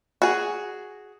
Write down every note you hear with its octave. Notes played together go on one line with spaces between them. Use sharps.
F#4 G#4